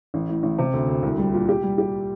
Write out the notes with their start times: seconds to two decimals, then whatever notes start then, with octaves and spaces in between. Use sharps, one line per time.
0.14 A1
0.29 A2
0.43 A1
0.58 C3
0.73 D2
0.88 D2
1.03 C2
1.18 G3
1.33 A#2
1.49 G4
1.63 G3
1.78 G4